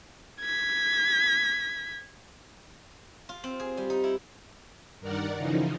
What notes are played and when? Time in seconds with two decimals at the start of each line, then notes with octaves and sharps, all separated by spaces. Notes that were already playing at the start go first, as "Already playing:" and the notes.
0.41 G#6 B6
3.29 F4
3.44 C4
3.60 G#4
3.77 G3
3.90 D#4
4.04 E4
5.00 G2 D#3 A#4 D5 F#5
5.37 C#3 E3 F3 D#4